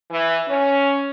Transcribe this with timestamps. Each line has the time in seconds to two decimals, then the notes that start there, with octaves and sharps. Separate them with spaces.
0.11 E3
0.48 C#4